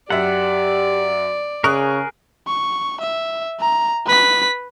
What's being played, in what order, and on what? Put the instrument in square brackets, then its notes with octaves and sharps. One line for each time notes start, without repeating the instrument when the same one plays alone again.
[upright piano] F#2 E5 [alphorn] G4 [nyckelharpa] D5 [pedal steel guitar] F#5
[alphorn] C#3 [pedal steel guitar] G#4 A#4 [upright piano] C#6 D#6 F#6
[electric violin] C#6
E5
A#5
B4 B6